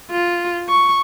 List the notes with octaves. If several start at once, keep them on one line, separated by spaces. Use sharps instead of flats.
F4
C#6